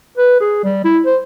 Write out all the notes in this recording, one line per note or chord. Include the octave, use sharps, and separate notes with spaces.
B4
G#4
G3
E4
C5